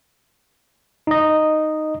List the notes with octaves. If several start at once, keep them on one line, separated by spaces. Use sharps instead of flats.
D#4 D#5